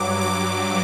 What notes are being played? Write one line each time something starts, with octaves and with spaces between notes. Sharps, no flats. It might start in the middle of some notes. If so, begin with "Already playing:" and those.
Already playing: G2 F#3 D6
D6